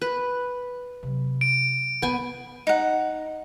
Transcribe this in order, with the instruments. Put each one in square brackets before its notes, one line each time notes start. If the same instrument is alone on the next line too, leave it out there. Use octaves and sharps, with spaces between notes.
[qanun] B4
[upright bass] C3 F#3
[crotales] D7
[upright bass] F#2 D3 [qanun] B3 G#5
[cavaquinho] D#4 F#5